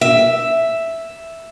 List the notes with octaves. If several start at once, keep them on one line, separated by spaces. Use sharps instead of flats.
E5